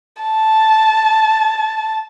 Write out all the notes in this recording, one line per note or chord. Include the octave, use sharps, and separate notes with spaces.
A5